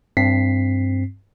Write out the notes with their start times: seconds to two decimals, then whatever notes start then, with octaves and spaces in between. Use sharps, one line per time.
0.17 G2 C4 B6 C7